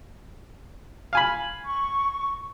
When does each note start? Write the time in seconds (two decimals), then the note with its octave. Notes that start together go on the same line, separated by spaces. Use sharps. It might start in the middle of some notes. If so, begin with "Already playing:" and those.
1.13 F5 G#5 B5
1.66 C#6